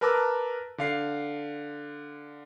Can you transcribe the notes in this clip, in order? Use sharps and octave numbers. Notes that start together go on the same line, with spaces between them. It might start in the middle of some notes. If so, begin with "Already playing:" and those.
A#4 B4 A5 A#5 D6 E6
D3 F5 C7